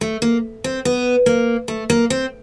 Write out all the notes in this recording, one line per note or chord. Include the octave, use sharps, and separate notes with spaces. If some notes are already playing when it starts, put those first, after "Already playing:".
A3
A#3
C4
B3
A#3
A3
A#3
C4